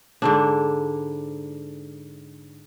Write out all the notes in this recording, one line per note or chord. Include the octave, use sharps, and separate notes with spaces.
G#2 D3 D4